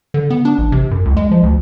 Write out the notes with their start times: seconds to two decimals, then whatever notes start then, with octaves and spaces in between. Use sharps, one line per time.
0.14 D3
0.30 B3
0.45 D4
0.58 A1
0.72 C3
0.91 F#2
1.05 C#2
1.17 G#3
1.31 F3
1.43 D2